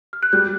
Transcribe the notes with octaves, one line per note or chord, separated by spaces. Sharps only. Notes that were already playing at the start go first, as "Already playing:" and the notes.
F6
F#6
G3 G6